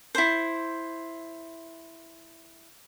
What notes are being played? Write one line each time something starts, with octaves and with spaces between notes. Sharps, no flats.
E4 C5